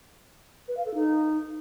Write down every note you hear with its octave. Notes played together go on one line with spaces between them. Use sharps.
B4
F5
A4
D#4